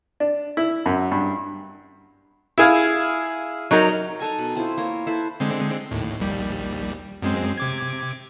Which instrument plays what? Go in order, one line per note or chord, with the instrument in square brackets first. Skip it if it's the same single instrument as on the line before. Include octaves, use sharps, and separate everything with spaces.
[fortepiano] D4
E4
F#2
G2
E4 G#4 F5
[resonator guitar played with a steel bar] F#3 D#4 A#4
[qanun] D#4 A4 G#5
B2
C4 E4 F4 C5
A#3 A#4 C#5 C6
E4 A4 B4 C5
[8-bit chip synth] D3 G#3 C4
D#2 A2
A#1 D#2 G3
F#2 G#3 C4
C3 D6 G#6